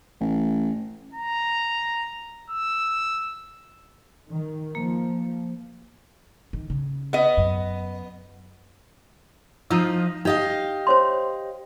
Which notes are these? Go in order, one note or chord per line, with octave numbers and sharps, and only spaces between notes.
A1
A#5
E6
D#3
F3 A#3
D#3
C#3
B3 D#5
F#2
F3 D#4 F4 E6
D#4 G4 D#5 F5
C5 C#5 C6